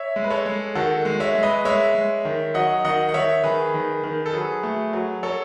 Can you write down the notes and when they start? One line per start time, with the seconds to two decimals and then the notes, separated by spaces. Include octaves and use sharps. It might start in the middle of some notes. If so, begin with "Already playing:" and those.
Already playing: C#5 E5
0.16 G#3
0.24 B4
0.30 A4 C#5
0.46 G#3
0.75 D#3 F#4 A4
1.05 G#3
1.20 C#5 E5
1.35 G#3
1.43 B4 D#5
1.65 G#3 C#5 E5
1.95 G#3
2.25 D#3
2.54 F#3 D#5 F#5
2.84 D#3 D#5 F#5
3.09 F#5
3.14 D#3 C#5 E5
3.44 D#3 G#4 B4
3.74 D#3
4.04 D#3
4.26 A4
4.34 F#3 G#4 B4
4.63 A3
4.93 F#3
5.23 F#3 A4 C#5